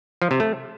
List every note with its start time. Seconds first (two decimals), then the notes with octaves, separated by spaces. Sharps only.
0.22 F3
0.31 C3
0.40 A3